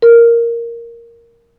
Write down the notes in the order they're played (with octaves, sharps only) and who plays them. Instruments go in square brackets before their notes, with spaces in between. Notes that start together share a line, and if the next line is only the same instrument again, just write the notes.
[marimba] A#4